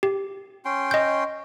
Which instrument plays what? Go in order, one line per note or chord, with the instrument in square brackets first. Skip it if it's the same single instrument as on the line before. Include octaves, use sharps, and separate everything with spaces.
[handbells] G4
[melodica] C#4 G5 C6
[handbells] D#5 G6